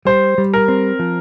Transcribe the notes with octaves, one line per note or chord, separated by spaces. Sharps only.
G3 C5
G3
A#4
C4
F3